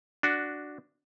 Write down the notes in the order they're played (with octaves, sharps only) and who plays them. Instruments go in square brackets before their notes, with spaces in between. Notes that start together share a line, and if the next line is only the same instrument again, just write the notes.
[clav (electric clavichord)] D4 F#4